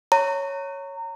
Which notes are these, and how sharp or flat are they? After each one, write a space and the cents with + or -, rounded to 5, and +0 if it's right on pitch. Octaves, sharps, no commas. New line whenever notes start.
C#5 +0 A#5 -25